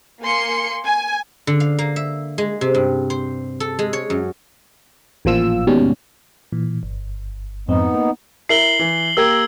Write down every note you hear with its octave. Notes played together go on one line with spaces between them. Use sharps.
A#3 G#5 C6 C#7
G#5
D3
F5
A#3
E5
G#3
C3
G2
C5
A4
G#3
C#5
F#2
A1 A#2 F3 F4 E6
D#2 G#2 B2 G3 C#4
A#2 E3
G1
F2 G#2 B3 C4 D#4
A#3
E4 A#4 C7 F#7 G7
E3
A#3 G4 A#4 E6 G#6